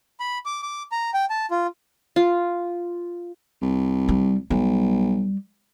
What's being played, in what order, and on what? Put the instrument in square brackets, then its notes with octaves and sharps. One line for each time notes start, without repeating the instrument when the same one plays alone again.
[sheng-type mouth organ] B5
D6
D6
A#5
G5
A5
F4
[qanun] F4
[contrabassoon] C2
[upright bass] G3
[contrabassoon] B1 [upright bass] G3